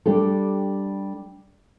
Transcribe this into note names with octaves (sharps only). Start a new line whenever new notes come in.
G3 D4 G4 A4